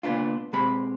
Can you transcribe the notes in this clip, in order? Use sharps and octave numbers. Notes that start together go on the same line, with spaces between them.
C#2 A#2 B3 D4 F4
B2 G#3 C4 G4 B5